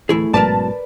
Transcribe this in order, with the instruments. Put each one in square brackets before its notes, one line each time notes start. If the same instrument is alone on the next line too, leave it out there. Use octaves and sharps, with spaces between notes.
[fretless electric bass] D1 E3 [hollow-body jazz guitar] A3 E4 G#4
[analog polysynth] A1 A5 [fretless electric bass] G#2 B2 F#3 [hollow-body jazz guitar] A#4 B4 D5